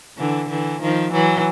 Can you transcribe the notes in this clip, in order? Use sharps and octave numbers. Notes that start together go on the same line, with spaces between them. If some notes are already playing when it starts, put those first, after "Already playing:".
D3 E3
D3 E3
D#3 F3
E3 F#3